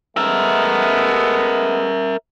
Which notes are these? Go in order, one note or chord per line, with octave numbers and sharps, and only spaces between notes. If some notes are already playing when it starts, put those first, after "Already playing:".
G#3 A3 B3 A#4 E5